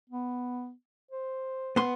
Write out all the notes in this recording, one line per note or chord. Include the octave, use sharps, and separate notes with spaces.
B3
C5
B3 C6